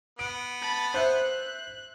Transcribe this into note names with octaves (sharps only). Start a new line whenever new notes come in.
B3 D7
A5 B5
C5 E5 F#6